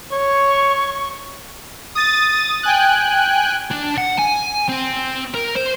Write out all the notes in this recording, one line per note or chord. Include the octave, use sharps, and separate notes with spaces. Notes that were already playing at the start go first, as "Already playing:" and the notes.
C#5 C#6
D#6 A6
G5 G#5 F#6
D4
F#5
G#5
C4
A#4
C5